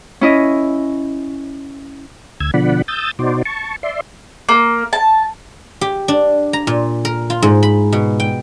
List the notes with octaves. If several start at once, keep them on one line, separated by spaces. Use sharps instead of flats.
C#4 E4 D#5
D2 E6 G#6
B2 D3 F3 D5 F#5 B5
D#6 E6 G6 A6
B2 D#4 F#4 C5 D5
A5 C#6
D5 E5 C6
A#3
A5
G4
D4
A#5
A#2
A#4
F4
G#2
B5
B2
G5